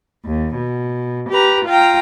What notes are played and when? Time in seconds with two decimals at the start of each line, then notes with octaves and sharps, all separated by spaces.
0.24 D#2
0.56 B2
1.30 G4 B4 A#5
1.66 F4 F5 G5 A#5